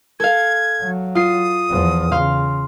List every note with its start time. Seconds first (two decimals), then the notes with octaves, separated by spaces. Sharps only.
0.20 A4 F5 G#6
0.81 F#3
1.15 F4 D#6 C7
1.70 E2 F3
2.12 C#3 F5 C6 F6